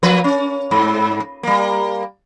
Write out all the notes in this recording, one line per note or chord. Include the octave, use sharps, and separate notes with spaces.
F3 A#3 B4
C#4
G#2
G3 A#3